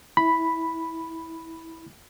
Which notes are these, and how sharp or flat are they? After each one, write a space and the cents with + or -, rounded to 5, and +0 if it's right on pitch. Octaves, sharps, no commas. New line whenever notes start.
E4 -15 B5 +0